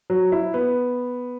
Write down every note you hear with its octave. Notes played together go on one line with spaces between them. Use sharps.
F#3
E4
B3